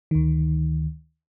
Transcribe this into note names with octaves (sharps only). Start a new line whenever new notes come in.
D2 D#3